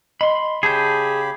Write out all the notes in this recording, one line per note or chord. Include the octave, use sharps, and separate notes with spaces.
D#5 B5 C6
C#3 G4 G#4 A5 B5 G6